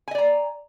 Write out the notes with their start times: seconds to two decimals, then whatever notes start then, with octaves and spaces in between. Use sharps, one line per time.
0.08 G#5
0.11 D#5
0.15 D5
0.18 A#5